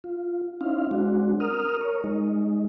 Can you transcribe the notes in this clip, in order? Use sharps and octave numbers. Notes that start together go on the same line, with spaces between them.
F4
C4 C#4 D#4 E4 F5
G#3 C4 D4 F#4
A#4 D#6 F6
A#4 C#5
G#3 D#4